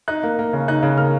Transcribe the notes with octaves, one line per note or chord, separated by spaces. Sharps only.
D#4 F#6
A#3
A#3
C#3
D#4 F#6
C#3
A#3 F6